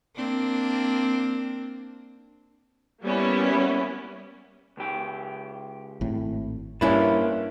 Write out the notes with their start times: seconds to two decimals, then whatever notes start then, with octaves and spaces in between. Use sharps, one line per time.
0.16 A#3 C4 D4
3.02 G3 A#3 B3 C#4 E4
4.77 C#2 G4
6.01 G#1 A2
6.81 G2 A#3 C#4 D4 E4 B4